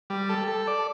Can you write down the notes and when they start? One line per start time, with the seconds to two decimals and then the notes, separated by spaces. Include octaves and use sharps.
0.10 G3
0.29 A4
0.48 A4
0.67 D5